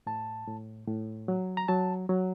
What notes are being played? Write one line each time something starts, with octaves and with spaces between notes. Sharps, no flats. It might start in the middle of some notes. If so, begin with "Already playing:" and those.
A2 A5
A2
A2
F#3
A#5
F#3 A5
F#3